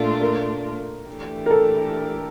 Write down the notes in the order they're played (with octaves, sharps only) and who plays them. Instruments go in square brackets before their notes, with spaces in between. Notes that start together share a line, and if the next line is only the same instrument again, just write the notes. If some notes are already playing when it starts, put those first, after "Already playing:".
Already playing: [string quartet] A#2 A3 D4 F4
[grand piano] A#4
[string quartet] E3 A3 D4 G4
[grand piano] A#4
A4